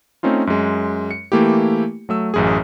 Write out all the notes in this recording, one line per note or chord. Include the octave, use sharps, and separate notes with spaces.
A3 C4 C#4 D#4 F4
F#2 G#3
C#7
E3 A3 A#3 E4 G4
F#3 A3 E6
A1 F#2 G#4